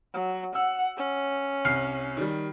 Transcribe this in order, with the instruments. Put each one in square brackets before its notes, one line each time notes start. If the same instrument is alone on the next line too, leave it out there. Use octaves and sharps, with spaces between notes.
[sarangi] F#3
[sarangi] F#5 [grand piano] E6
[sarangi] C#4
[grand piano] C2 F6 C7
D#3 G3